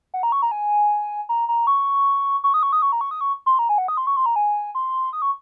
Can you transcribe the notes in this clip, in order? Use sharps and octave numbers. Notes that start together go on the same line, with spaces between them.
F#5
A#5
C#6
A#5
G#5
A#5
A#5
C#6
C#6
D#6
C#6
D#6
C#6
A#5
C#6
D#6
C#6
C6
A#5
G#5
F#5
D#6
C6
C#6
C6
A#5
G#5
C6
D#6
C#6